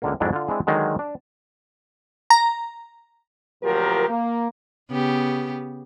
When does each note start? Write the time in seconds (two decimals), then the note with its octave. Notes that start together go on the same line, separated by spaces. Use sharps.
0.02 C#2 D3 A#3
0.20 F2 G#2 F#3 A#3 D4 E4
0.33 D3 F4
0.48 G#3 C4 D4 E4 G#4
0.67 D3 D#3 F#3 G#3
0.99 D4
2.30 A#5
3.63 D2 A#2 F3 F#3 G4 A#4
4.08 A#3
4.91 C#3 B3 G4